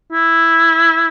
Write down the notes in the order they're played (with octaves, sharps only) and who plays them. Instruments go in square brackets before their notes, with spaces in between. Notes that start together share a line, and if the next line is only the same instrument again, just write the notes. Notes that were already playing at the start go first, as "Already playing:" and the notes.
[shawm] E4